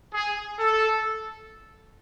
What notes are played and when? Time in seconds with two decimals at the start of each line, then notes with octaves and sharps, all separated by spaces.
0.12 G#4
0.58 A4